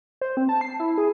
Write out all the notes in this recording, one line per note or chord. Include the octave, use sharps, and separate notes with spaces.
C5
C4
A5
C7
E4
G#4